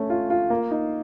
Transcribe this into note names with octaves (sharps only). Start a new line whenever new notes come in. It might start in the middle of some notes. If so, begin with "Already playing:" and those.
Already playing: A3 C#4
F4
F4
A#3
D#4